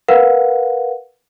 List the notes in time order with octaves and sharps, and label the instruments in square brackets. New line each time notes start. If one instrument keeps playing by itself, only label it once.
[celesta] A#4 B4 F5 F#5